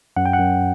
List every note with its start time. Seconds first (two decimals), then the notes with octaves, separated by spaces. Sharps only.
0.16 F#2 F#5
0.26 G5
0.33 F#5
0.39 F#2